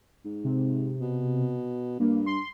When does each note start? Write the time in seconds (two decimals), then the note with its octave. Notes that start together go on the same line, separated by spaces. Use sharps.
0.25 G#2
0.44 C3
1.01 B2
2.00 G2 A#3
2.26 C6